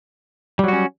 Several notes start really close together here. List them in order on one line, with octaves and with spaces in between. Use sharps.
G3 F#3 F#4 C#4